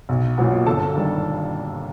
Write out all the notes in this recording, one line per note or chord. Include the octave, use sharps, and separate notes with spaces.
B1
A#2 F#3 B3
G1 A4 A5
G2 D#3 G3